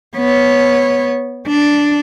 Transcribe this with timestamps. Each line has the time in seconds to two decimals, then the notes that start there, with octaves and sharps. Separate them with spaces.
0.16 B3 C#5
1.47 D4